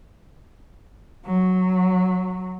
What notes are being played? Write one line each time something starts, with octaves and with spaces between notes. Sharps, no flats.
F#3